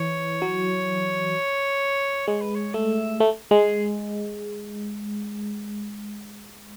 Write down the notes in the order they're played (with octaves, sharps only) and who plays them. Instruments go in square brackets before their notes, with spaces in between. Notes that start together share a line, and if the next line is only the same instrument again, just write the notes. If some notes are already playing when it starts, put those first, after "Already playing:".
Already playing: [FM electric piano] E3 [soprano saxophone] C#5
[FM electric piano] F#3
[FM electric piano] G#3 [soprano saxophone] C#5
[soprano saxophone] B4
C#5
[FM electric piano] A3 [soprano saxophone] E5
[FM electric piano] A3
[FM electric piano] G#3 [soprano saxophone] G#4